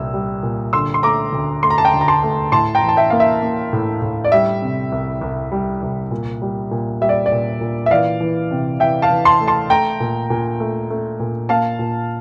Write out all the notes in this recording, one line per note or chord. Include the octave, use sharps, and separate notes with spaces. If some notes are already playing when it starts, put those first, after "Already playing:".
Already playing: C2 A#2 G3 E6
G3
A#2
D3 C6 E6
C6
A3 A#5 D6
D2
A3 C6
A#5
A5
G5 A#5
D2
A#5
A5 C6
A3
A2 A5 C6
G5 A#5
E3
A5
E5 G5
A#3 F5
E5
A#3
A2
A2
D5
G3 E5
C3
C2
C2
G3
C2
A#2
G3
A#2
G3 E5
D5
D5
A#2
A#2
E5
E3 D5 F5
E3
C3
E3 E5 G5
F5 A5
E3
A5 C6
A3
A5 C6
A3 G5 A#5
A#2
A#2
A3
A3
A#2
A#3 F5 A5
A#2